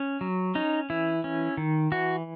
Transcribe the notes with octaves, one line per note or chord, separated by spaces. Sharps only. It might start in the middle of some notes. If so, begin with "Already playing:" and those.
Already playing: C#4
F#3
C#4 D#4
E3 E4
C#4
D#3
E3 F#4